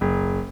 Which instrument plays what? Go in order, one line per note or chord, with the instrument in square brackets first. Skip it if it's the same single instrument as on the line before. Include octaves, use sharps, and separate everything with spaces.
[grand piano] F#1